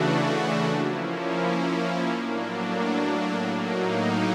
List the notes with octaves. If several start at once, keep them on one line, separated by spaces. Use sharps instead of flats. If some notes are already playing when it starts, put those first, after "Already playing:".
Already playing: C#3 E3 A3 D4 F#4
F3 A#3 C#4 E4
A2 F#3 A#3 D4
A2 F#3 A#3 D#4